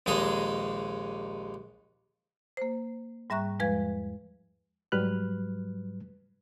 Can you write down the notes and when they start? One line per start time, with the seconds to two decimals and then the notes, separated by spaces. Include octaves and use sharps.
0.06 A#1 D#2 G#3 G#4 A4 A#5
2.57 A#3 C5
3.30 G#2 G3 E5 A#5 C#6 F#6
3.59 E2 F3 G#3 B4 F5 G#6
4.92 G#2 F#3 G3 B4 F6 F#6